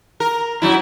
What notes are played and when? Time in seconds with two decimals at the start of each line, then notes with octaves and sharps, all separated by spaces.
0.20 A#4
0.62 F#2 F#3 E4